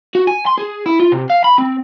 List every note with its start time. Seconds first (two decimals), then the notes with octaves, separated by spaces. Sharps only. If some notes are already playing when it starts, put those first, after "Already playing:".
0.15 F#4
0.27 G#5
0.46 C6
0.58 G#4
0.86 E4
1.00 F4
1.12 C3
1.30 F5
1.44 B5
1.58 C4